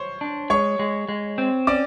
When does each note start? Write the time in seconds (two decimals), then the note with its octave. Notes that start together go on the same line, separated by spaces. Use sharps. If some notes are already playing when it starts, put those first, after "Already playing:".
Already playing: C5 C#5 C#6
0.21 D4
0.50 G#3 C#5 C#6
0.79 G#3
1.09 G#3
1.38 C4
1.67 C#4 D5 D6